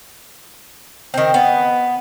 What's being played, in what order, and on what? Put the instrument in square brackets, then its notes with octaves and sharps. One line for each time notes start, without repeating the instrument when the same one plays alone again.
[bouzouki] D#3 C4
B3